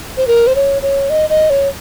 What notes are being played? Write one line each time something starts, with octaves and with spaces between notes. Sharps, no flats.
C5
A#4
C5
C#5
C#5
D#5
D#5
C#5